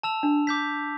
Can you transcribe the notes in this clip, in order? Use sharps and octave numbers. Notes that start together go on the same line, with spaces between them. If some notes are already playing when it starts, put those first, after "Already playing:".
A5 E6 F7
D4
D6 G6 B6